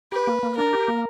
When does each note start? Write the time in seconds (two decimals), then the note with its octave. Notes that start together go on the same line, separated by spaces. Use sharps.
0.12 G4 B4
0.27 A#3
0.43 A#3
0.57 D4 A#4
0.73 G4
0.88 A#3